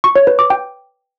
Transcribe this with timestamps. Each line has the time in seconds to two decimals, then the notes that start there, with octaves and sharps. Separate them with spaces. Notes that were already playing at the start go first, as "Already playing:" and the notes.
0.04 C#6
0.16 C#5
0.27 B4
0.39 D6
0.50 G5